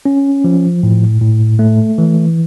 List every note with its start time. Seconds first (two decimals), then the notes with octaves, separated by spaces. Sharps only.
0.05 C#4
0.44 F3
0.83 A2
1.21 A2
1.59 A3
1.98 E3